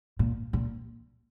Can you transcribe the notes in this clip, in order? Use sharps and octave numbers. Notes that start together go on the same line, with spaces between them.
A#2
A#2